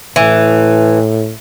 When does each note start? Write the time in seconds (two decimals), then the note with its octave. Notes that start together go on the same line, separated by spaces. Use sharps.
0.16 A2 E3